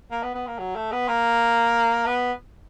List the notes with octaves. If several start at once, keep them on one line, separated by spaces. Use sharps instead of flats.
A#3
B3
B3
A#3
F#3
A3
B3
A#3
B3